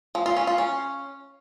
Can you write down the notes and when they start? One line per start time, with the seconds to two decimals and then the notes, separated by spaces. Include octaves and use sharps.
0.15 F3
0.26 F4
0.37 C#4
0.47 F4
0.58 C#4